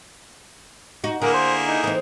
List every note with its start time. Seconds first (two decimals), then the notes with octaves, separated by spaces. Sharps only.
1.04 D#4 F#4
1.22 D3 A#3 E4 G#4 A#4
1.34 C5
1.67 D#4
1.84 E3 C4 D#4